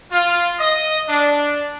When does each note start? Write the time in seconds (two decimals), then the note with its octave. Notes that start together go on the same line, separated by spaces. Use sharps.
0.11 F4
0.59 D#5
1.07 D4